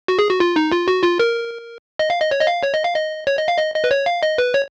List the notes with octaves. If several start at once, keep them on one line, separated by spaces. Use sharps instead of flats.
F#4
G#4
F#4
F4
D#4
F4
F#4
F4
A#4
D#5
F5
D#5
C#5
D#5
F5
C#5
D#5
F5
D#5
C#5
D#5
F5
D#5
D#5
B4
C#5
F5
D#5
B4
C#5